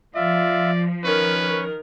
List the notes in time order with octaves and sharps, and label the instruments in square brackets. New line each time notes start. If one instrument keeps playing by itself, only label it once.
[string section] F3 [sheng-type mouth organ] F4 E5 [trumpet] D5
[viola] D#3 A#4 [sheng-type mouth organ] C#4 C#6 [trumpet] B4